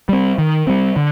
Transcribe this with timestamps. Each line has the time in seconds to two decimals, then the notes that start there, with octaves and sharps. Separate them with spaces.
0.09 G3 C4
0.38 D#3
0.67 G3 C4
0.96 D3